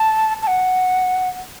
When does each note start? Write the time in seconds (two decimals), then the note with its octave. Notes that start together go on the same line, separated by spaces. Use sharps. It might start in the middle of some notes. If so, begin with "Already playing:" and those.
Already playing: A5
0.43 A5
0.47 F#5